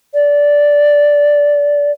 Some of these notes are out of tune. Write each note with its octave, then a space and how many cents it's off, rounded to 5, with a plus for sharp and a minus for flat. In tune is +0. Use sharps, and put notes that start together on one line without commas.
D5 -10